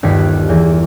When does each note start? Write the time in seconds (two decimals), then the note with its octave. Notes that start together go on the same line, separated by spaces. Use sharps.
0.03 G1 D#2 D5 B6 C7
0.49 E2 A#3